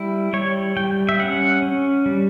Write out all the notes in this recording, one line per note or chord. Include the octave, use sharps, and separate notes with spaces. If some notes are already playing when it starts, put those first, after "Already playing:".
Already playing: G3 E4
G3 C#5
G3 G5
E5
C#4 F#5
C#4
G3